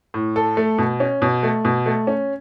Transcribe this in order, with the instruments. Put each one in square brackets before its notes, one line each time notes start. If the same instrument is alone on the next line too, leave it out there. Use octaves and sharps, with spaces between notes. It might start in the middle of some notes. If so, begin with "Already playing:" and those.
[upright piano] A2
A4
A3
B2
C#4
B2
A3
B2
A3
C#4